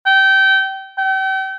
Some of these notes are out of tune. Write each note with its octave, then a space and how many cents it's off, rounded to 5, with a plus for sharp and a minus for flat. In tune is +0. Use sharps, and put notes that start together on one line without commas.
G5 -25
G5 -40